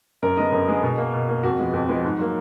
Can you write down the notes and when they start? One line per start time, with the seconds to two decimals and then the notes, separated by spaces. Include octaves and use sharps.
0.22 F#2 A#4
0.37 D3 G#3 B3 D#5
0.52 F#2
0.68 D3 G#3 B3 G#4
0.83 B2
0.98 A#3
1.14 B2
1.29 A#3
1.43 F2 F#4
1.59 F3 G#3 B3
1.74 F2
1.89 F3 G#3 B3
2.04 G#2
2.19 F#3 A#3